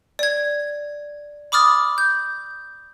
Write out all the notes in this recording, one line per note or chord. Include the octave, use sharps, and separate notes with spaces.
D5 G#6
B5 D6 D#6 F6 A6
G6